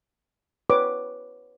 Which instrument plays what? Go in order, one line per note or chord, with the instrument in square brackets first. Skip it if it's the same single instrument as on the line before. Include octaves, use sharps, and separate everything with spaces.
[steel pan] B4 C#5 D6